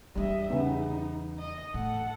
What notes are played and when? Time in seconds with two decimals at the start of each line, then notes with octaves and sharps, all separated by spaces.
0.16 E2 G3 D4 D#5 E5
0.50 C#3 B3 D#4
1.40 D#5
1.74 A2 A4 F#5